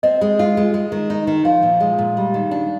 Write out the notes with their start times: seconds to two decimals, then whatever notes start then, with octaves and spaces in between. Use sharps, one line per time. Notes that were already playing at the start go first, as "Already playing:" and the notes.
0.03 C4 D#5
0.21 G#3
0.39 F4
0.57 G#3
0.74 G#3
0.92 D#3
1.10 D#4
1.27 D#3
1.45 F3 F5
1.62 A#2
1.80 G#3
1.99 A#2
2.17 G3
2.34 D#3
2.51 D4